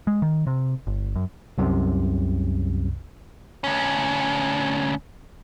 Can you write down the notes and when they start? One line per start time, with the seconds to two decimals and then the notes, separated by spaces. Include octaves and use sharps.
0.07 G#3
0.22 D#3
0.47 C3
0.87 G1
1.16 F#2
1.58 C2 F#2 C3
3.64 D2 C#4